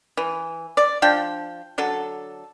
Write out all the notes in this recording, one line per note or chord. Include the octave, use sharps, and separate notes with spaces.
E3
D5
F3 D4 G5
D3 F#3 A4